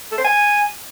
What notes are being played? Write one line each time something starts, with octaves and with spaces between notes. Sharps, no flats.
A4
C5
G#5